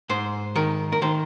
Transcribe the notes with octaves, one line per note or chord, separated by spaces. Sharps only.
G#2 C5
D#3 A#4
A#4
D#3 C5